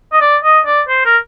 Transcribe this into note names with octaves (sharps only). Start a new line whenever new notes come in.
D#5
D5
D#5
D5
C5
A#4